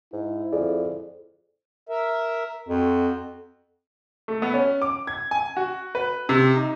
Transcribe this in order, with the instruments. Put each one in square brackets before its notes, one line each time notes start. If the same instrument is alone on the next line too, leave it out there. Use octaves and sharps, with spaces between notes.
[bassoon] G#2 [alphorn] E4
[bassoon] F2 [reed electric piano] G#4 D5
[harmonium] A#4 E5
[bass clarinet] F2 [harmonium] F#4
[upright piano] A3
B3
C#4
D6
G#6
G#5
F#4
B4
C3
D#4